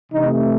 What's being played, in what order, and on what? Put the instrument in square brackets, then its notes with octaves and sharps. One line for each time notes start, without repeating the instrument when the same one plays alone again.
[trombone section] C3 E3 A3 D#4